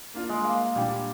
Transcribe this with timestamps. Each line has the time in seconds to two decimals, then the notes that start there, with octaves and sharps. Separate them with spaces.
0.14 A#3 D4 F4
0.29 G#3
0.45 A#3
0.75 A#2 G3 D4 G4